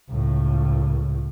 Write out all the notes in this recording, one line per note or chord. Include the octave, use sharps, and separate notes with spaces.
C#2 A2